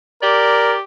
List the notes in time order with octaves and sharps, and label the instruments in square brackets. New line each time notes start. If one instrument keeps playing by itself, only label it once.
[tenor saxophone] G4 [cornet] A#4 [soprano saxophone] D5